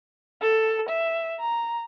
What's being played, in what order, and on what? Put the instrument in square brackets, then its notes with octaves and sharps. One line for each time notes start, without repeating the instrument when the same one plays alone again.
[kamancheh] A4
E5
A#5